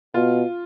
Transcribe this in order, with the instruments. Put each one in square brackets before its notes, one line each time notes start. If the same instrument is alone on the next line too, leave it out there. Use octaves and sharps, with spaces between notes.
[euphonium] B2 [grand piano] F4